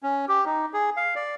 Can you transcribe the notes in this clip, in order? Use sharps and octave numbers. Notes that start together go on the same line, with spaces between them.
C#4
G4
D#4
G#4
F5
D5